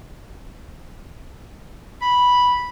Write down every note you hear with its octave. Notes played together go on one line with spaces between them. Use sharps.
B5